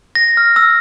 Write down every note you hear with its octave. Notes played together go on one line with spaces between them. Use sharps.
A#6
F6
E6